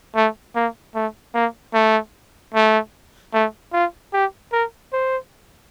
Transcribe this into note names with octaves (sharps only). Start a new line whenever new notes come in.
A3
A#3
A3
A#3
A3
A3
A3
F4
G4
A#4
C5